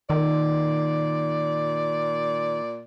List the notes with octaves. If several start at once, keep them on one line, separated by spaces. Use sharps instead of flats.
A#2 D#3 D5